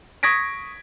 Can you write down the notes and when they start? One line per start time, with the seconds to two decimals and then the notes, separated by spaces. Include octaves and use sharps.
0.23 C#6 D#6 G#6 A#6 B6 D7